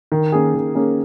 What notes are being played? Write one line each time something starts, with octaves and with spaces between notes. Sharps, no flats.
D#3
A#3 C#4 G#4
D#3
A#3 C#4 G#4